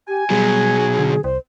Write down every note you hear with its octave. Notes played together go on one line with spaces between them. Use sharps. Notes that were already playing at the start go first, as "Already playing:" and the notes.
G4 G#5
B2 F#3 G3 G#4
D3
C2 C5